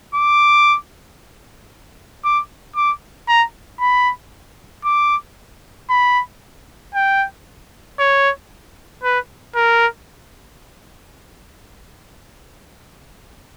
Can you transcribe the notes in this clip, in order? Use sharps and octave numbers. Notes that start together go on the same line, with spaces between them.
D6
D6
D6
A#5
B5
D6
B5
G5
C#5
B4
A#4